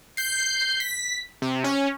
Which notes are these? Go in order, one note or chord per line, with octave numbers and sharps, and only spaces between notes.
G6 C7
B6
C3
C#4